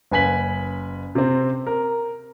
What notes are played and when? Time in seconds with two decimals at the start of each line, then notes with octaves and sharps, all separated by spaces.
0.11 F#1 B4 G#5 B6 F#7
1.15 C3 C4
1.67 A#4